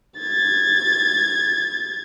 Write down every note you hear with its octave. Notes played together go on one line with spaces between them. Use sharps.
G#6 A6